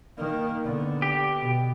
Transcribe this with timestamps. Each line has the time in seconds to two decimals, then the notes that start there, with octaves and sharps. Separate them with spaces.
0.17 D#3 A#3
0.65 D3 B3
1.02 G4
1.41 B2